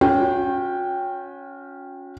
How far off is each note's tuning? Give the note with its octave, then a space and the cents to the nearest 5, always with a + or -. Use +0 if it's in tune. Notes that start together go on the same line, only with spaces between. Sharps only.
C#4 +5 F#4 -40 G5 +0